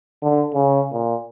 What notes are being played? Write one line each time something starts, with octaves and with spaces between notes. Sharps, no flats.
D3
C#3
A#2